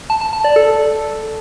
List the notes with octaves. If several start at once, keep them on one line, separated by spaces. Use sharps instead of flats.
A5
A5
A5
D5
A4